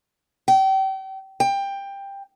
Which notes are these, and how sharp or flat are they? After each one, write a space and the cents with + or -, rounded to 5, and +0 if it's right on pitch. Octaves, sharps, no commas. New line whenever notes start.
G5 -35
G5 +15